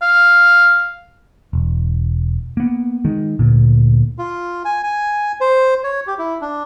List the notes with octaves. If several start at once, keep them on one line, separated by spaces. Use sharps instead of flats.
F5
E1
A#3 B3
D#3 G#3
D2 A#2
F4
G#5
G#5
C5
C#5
G4
E4
D4